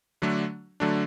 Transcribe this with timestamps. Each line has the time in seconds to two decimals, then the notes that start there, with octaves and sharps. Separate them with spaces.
0.22 D3 F#3 A3 D4
0.80 D3 F#3 A3 D4